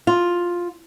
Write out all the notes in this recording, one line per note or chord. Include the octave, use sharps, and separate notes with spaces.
F4